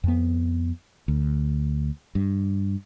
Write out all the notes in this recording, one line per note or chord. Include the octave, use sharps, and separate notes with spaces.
F2 B3
D2
G2